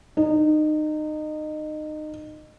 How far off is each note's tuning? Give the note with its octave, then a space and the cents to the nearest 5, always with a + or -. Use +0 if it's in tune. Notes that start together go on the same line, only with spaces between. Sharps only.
D#4 -25